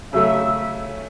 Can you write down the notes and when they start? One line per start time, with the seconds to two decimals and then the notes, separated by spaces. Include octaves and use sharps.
0.13 C#3 F#3 A3 E5